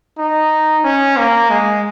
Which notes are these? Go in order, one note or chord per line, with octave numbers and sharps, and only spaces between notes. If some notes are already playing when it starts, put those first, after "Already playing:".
D#4
C#4
A#3
G#3